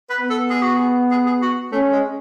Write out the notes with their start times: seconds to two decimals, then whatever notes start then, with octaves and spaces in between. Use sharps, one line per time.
0.10 B4
0.20 B3
0.30 A4
0.50 G#4
0.62 F#4
0.75 G#4
1.11 G#4
1.27 G#4
1.42 F#4
1.72 A3 C#4
1.92 G#3